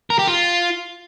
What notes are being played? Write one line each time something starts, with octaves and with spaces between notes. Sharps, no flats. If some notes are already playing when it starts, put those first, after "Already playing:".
A#4
G4
F4